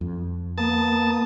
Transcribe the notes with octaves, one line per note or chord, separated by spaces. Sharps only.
F2
A#3 B3 A5 D#6